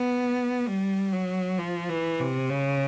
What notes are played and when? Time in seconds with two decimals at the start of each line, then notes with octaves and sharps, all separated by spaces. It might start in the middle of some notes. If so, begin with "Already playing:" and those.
Already playing: B3
0.68 G3
1.12 F#3
1.59 F3
1.89 E3
2.20 C3
2.50 C#3